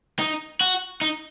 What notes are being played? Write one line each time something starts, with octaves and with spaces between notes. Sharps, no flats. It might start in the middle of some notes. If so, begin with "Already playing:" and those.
D#4
F#4
D#4